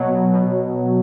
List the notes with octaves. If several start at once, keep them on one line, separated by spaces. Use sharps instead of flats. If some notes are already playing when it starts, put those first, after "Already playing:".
Already playing: B2 F#3
B2
B2